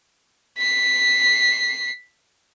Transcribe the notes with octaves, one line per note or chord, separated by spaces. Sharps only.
B6 C7